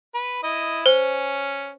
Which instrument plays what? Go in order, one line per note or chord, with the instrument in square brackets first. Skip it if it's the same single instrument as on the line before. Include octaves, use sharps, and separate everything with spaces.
[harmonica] B4
E4 D#5
[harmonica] C#4 [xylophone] C5